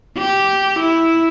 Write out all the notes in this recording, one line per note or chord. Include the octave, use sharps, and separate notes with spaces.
G4
E4